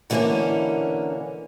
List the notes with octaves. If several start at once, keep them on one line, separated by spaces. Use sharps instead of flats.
B2 D3 E3 G3 A#3 C#4